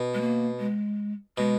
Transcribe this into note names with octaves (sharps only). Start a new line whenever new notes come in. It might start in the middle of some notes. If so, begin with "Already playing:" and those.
Already playing: B2
G#3
A#3
G#3
B2 G#3